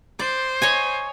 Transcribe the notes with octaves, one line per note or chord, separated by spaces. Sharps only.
C5 D5
C#5 D#5 G#5